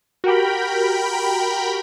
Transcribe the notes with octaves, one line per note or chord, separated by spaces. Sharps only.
F#4 G4 A#4 G5 B5